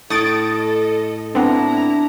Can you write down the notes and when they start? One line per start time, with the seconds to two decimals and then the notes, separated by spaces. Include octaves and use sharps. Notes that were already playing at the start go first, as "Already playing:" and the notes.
0.10 A2 A4 D#5 D#6 A6 D7
1.35 B3 C4 D4 E4 A#5